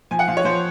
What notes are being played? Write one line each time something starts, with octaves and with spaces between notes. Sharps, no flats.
F3 G#5
F#5
F3 F5
C#5
F3 C5